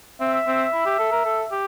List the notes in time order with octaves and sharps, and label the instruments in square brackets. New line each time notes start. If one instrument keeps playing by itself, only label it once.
[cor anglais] C4 [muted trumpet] E5
[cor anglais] C4
E4
G4
A4
A#4
A4
G4